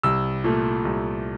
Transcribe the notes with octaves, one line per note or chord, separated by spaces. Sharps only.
C2 E6
A#2 A3
C2